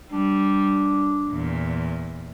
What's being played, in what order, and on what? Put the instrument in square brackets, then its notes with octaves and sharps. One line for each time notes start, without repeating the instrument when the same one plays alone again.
[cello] G3 [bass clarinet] D4
[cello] E2 A#2